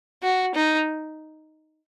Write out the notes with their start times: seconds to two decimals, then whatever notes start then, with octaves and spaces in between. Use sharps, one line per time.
0.23 F#4
0.55 D#4